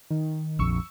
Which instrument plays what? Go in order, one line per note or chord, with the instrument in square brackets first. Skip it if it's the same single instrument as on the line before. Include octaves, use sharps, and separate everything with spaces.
[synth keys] D#3
[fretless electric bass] A#1 F2 [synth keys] C#6 E6